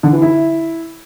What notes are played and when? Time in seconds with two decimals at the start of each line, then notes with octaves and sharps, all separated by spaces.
0.03 D3
0.13 E3
0.22 E4